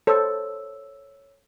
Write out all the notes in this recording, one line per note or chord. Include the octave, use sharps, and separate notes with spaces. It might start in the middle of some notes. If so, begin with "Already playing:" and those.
A4 C5 C#5 E6